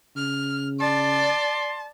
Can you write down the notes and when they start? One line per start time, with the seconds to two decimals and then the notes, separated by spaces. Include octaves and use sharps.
0.17 C#3 F6
0.80 D5 A5 C6